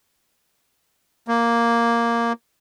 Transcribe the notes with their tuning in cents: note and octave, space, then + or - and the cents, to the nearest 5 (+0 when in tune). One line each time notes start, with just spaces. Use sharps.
A#3 +0